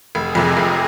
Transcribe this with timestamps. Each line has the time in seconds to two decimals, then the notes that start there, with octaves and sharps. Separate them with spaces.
0.15 F1 G#4
0.35 F2 C3
0.56 F1 G#4